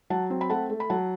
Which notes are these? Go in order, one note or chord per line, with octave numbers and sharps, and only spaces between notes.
F#3 F#5 A5
C4
B5
A3 F#5 A5
A3
B5
F#3 F#5 A5